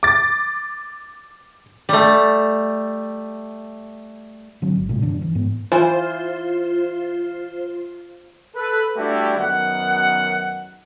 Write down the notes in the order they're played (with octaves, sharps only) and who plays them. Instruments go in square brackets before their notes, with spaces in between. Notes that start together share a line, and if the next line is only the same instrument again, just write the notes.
[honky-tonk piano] D6 A6
[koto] G3 A3
[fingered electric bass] D3 F#3 C4
G#1
A2 C3 G#3
F#2 D#3 D4
E3
G#2 B3
[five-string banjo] E3 [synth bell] F4 C5
[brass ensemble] A4 B4
G3 A3 D4 E4 F#4 G4
F#2 D#3 B3 F#5